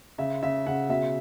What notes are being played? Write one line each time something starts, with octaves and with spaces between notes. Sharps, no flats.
C#3 E5
C#3 E5
C#3 F#5
B2 E5